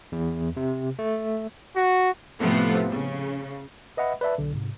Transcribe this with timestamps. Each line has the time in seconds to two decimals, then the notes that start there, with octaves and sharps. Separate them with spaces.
0.12 E2
0.57 C3
0.99 A3
1.76 F#4
2.40 A2 C3 F3 A3 B3
2.90 C#3
3.97 B4 D#5 E5 F#5 B5
4.21 B4 D5 E5 A5
4.38 B1 D3
4.53 G#2 C3